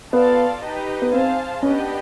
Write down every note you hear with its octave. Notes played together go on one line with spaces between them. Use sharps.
B3 F4 A4 D5 F5 A5
D#4 G4 B4 D#5
B3
C4 G#4 C5 F5 A5
B3 C#4 D4 G4 B4 D#5